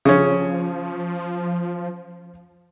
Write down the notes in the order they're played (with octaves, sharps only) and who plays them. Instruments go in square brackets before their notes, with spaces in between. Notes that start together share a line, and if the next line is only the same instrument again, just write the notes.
[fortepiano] C#3 C#4 [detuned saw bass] F3